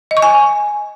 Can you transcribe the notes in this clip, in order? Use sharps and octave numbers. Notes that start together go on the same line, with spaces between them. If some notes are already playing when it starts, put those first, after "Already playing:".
D#5
C#6
G#5